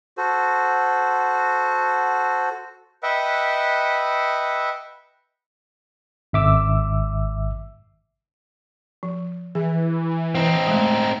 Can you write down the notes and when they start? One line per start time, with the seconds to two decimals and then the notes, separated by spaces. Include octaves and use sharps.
0.17 F#4 A4 C5
3.03 B4 D#5 E5 F#5 G5
6.33 G#1 E5 D6 E6
9.03 F3
9.55 E3 G#4
10.35 C4 D#4
10.68 G#3 A3